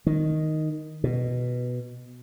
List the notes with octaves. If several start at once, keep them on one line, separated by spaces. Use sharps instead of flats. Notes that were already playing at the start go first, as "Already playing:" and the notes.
D#3
B2